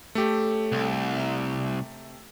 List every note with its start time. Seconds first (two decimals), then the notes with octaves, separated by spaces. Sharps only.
0.15 A3 C#4 G4 A4
0.72 C2
1.16 C3 C#5 A#5